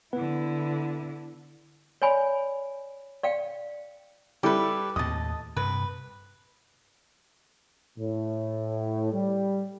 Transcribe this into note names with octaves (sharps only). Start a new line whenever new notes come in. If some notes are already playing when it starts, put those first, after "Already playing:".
D3 B3 E4 B4 F#5
C#5 D5 G#5 B5
D5 F5 G5
G3 E4 G4 A4 B4
D#2 A2 D#5 A5 D#6
G2 C3 B4
A2
G3